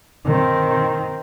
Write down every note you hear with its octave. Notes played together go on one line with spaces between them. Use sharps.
D#3 C4